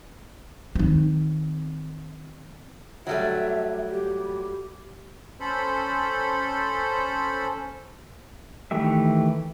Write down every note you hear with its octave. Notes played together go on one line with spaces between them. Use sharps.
D#3 C4
F#3 G3 A3 E5
G4
C#4 A4 C5 B5
D#3 E3 A3 G4 E5